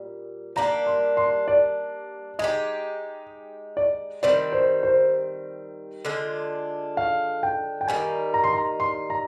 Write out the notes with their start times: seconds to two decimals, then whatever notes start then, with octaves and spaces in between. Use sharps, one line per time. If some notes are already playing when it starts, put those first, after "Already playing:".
Already playing: A#2 G3
0.56 G3 A#3 D4 A#5
0.87 C6
1.17 C6
1.48 D5
2.39 G#3 D#4 G4 D#5
3.77 D5
4.23 D#3 G3 C4 D5
4.52 C5
4.83 C5
6.05 D3 G#3 D4 F4
6.97 F5
7.43 G5
7.81 G5
7.88 D#3 G3 A#3 D#4 G#5
8.34 A#5
8.44 C6
8.53 A#5
8.80 C6
9.10 A#5